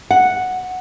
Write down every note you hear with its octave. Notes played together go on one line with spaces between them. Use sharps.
F#5